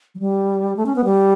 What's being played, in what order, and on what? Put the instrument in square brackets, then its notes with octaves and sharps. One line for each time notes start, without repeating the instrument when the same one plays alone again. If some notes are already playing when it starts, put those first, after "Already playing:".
[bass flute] F#3
G3
A3
C#4
B3
G3